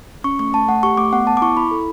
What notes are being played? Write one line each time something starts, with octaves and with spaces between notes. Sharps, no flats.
C#4 C#6
A3 C#6
A3 A5
A3 F#5
G4 C#6
A3 D6
B3 F#5
B3 A5
D6
E4 C#6
E4 B5
A4